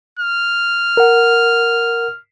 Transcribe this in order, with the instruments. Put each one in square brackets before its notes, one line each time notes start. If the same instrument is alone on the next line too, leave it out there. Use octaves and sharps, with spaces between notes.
[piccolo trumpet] F6
[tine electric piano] A#4 F#5